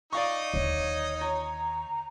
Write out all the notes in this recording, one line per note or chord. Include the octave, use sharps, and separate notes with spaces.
D#4 D5 D#5 F5 C#6
D#2 D3 C#5
C#5 A#5